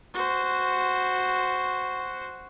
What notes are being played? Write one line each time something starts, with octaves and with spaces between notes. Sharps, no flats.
F#4 C5